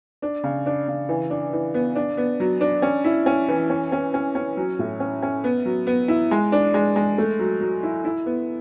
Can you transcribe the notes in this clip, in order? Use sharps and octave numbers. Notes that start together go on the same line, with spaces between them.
D4
C#3
D4
C#3
E3
D4
E3
B3
D4
B3
F#3
D4
C#4
E4
C#4
E3
C#4
C#4
C#4
C#4
F#3
A2
C#4
C#4
B3
F#3
B3
E4
G#3
D4
G#3
G#3
A3
F#3
F#3
E4
E4
B3